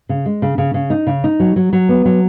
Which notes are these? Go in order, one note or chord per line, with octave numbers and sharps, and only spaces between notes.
C#3
G#3
C#3
C#3
C#3
D#4
C#3
D#4
F#3
F#3
F#3
B3
F#3